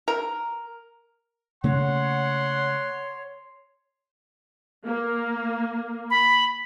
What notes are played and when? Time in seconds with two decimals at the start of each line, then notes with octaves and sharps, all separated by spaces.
0.08 A#4
1.64 C#3 A3 A#3 C#5 F#5 C6
4.85 A#3
6.10 B5